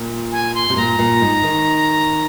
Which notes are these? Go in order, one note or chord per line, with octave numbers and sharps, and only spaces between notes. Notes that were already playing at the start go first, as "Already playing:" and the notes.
Already playing: A#2
G#5
C6
C3
A#2 A#5
A#2
G#2
D#3